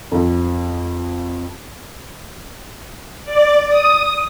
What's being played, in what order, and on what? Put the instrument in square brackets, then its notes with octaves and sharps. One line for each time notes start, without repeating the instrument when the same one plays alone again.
[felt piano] F2
[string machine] D5
D#6